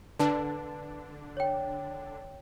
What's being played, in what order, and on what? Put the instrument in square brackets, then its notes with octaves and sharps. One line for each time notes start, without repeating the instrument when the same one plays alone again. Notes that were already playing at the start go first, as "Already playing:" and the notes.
[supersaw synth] D3 D4 [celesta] B4 A5
[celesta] C#5 G5